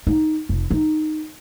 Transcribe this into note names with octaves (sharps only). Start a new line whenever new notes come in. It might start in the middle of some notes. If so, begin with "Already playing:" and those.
D#4
F1
D#4